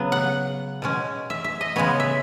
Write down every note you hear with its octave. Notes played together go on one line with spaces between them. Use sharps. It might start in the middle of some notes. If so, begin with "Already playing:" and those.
Already playing: C#3 F#3 B3
F#5
B2 G#3 C#4
E5
E5
D#5
C#3 G#3 B3 C#5
E5